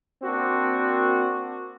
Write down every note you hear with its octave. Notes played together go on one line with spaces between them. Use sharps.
A#3 C4 D4 F#4